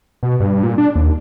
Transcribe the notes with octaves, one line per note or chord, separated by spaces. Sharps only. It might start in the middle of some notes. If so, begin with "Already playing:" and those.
B2
G2
A#2
D4
D#2